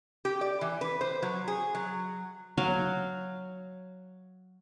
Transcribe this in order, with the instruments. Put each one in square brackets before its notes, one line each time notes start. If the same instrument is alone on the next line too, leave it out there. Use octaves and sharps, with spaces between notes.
[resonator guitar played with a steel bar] G4
D5
E3
B4
C5
F#3
G#4
F#3
[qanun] F#3 F#4 F5